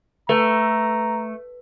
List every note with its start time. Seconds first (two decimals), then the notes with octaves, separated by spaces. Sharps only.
0.29 A3 B4 A#5